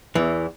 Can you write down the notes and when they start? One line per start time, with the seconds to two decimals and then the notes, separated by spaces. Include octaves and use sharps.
0.15 E2 E3